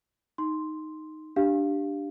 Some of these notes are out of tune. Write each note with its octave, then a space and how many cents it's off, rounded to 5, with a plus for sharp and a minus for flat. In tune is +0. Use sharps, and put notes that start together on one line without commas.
D#4 +0 C6 +0
D4 +0 G4 +0 F5 +0